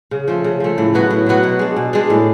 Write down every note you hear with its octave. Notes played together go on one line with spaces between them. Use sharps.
C#3
F3 A3
C#3
F3 A3
A2
F#3 B3 F#4
A2
F#3 B3 F#4
B2
G#3 D4
B2
G#3 D4
A2